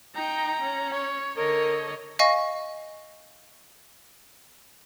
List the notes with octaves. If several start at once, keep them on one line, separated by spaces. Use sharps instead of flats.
D#4 G5 A#5
C#4
C#5
D3 A#4 C#5 D#5
D#5 F5 G#5 C#6 A#6